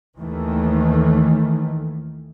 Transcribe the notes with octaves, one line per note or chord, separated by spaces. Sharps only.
D#2 D#3 E3 A3